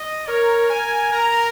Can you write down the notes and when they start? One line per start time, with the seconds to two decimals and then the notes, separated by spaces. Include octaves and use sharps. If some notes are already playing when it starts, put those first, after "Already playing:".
Already playing: D#5
0.27 A#4 C#5
0.70 A#4 G#5
1.12 A#4 A#5